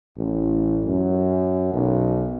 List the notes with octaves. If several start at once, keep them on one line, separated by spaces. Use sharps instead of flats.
A1
F#2
B1